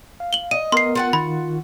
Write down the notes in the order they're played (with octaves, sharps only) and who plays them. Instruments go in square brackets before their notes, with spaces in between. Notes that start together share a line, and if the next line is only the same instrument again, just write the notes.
[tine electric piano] F5
[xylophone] F#7 G7
[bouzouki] D#5 [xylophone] D#7
[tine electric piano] B3 A#4 [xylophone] C6 C7
[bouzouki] F4 F#4 F#5
[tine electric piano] D#3 [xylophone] B5